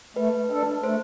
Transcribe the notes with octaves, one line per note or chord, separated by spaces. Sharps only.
A3 B4
D4 A4
A3 C5